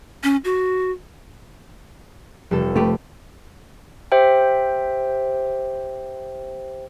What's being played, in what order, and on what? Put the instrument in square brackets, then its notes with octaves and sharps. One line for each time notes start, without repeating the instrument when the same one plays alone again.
[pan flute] C#4
F#4
[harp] F1 G3 A4
[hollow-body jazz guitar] A3 G4 B4
[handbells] G4 C5 E5 G5